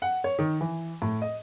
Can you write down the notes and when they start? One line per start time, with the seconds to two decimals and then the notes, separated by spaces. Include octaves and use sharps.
0.02 F#5
0.24 C#5
0.39 D#3
0.61 E3
1.02 A2
1.22 D#5